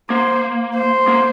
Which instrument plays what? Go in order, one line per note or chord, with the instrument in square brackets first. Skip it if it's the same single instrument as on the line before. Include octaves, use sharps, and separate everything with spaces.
[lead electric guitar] A#3 [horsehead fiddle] C5
[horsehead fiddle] C5
[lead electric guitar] A#3